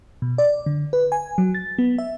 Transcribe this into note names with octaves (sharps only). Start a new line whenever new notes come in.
B2
D5
D3
B4
G#5
F#3
A6
B3
E5